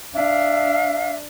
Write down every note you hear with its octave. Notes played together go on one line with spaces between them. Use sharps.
D4 E5 F5